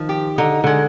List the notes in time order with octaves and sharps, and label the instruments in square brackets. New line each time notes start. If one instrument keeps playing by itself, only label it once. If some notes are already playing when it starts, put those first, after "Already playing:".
Already playing: [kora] D#3 [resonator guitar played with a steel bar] F3
[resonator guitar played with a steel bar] G4
[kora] D3 [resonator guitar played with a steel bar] D#4
[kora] D3 [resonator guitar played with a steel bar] G#3